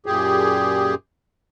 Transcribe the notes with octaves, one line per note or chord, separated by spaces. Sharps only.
F#2 A#2 G4 G#4